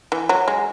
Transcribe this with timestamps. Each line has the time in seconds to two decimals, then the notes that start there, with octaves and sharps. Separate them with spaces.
0.12 E3
0.29 F#3
0.48 G#3